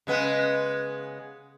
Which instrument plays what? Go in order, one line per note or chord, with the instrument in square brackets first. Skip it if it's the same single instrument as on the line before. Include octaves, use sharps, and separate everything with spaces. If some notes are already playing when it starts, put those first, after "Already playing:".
[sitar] C#3 G#3 B3